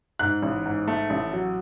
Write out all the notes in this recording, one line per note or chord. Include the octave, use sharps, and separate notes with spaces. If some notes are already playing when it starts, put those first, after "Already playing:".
G#2 F#6
A1
G#2
A3
A1
F#3